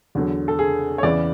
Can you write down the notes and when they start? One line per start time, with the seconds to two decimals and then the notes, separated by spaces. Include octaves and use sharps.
0.15 E2 D3 F#3
0.48 A4
0.59 G#4
0.98 C#5
1.03 E2 C#3 E3 D5